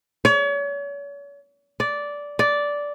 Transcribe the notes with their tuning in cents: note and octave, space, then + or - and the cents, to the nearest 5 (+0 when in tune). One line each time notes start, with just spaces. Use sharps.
C#5 +40
D5 -10
D5 -10